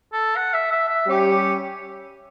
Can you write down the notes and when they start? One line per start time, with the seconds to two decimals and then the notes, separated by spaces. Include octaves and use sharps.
0.13 A4
0.36 F#5
0.54 E5
0.72 E5
0.89 E5
1.07 G3 C#4 G4